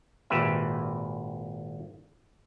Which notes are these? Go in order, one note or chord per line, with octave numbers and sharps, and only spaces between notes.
G#1 A#2 G4 B4 E5